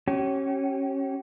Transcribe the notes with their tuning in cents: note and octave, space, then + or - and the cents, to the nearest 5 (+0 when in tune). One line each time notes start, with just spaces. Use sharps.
C#4 -20 G4 -40